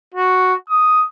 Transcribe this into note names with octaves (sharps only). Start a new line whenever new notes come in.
F#4
D#6